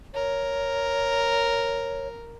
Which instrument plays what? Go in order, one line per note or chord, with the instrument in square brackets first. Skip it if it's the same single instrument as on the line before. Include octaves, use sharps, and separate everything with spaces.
[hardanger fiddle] A#4 [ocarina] C#5